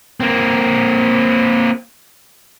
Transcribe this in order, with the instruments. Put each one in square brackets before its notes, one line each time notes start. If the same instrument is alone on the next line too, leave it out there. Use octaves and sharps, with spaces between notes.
[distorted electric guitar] A#3 C4